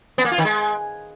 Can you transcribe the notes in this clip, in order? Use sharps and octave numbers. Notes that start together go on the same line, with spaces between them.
B3
A#3
F4
D#3
G#3